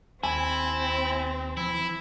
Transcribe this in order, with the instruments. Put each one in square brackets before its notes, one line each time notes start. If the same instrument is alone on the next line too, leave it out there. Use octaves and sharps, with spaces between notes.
[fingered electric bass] D#2 [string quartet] C4 [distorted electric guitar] E4 [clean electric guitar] G#5
[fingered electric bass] E3 F3 [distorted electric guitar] E4